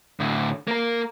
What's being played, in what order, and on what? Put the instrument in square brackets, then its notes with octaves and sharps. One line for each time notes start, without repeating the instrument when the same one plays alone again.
[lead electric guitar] A2 D3
A#3 A#4